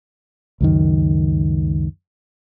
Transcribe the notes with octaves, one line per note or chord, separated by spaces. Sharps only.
C#2 F#2 D#3